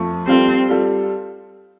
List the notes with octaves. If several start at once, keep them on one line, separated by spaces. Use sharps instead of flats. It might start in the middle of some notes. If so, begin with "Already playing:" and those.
Already playing: F2 F3 A3
G3 C4 F4 A4
G3 F4 A4